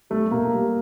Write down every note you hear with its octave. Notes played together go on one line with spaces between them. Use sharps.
G3 A3
A#2 A#3
G3